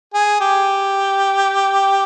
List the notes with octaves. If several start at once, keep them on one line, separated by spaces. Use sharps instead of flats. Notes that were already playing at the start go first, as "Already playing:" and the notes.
G#4
G4